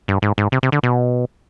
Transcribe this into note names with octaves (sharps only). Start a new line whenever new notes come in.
G2
G#2
G#2
C3
C3
D3
B2